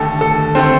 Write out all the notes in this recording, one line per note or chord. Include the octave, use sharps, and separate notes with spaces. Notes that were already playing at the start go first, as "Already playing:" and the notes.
Already playing: D#2 D3 A3 A4
A4
D3 A3 C4 C5